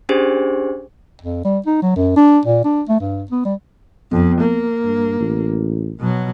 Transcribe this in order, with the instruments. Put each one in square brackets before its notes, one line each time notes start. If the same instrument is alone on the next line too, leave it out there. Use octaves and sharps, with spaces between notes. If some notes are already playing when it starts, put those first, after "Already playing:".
[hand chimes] C#4 D4 G4 G#4 C5
[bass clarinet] F2
G3
D#4
F#3
F#2
D4
A#2
D4
A3
G2
B3
G3
[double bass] F2 [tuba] B3
[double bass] A#3
[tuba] G2
A1
[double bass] B2 F#3